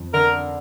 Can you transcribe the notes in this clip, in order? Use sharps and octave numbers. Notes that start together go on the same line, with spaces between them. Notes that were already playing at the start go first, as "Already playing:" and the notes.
Already playing: F2
D3 A#4